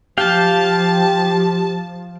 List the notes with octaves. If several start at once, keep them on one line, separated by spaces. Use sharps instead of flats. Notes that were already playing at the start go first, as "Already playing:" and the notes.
F3 G4 F5 G5 A5